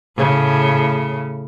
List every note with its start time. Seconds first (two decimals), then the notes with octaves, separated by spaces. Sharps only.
0.17 A2 C#3